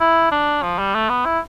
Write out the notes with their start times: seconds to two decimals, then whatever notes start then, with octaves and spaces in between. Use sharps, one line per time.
0.01 E4
0.32 D4
0.63 F3
0.79 G3
0.94 A3
1.09 B3
1.25 E4